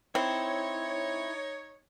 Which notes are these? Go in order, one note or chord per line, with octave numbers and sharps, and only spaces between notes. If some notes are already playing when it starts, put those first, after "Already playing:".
C4 D#4 E4 C#5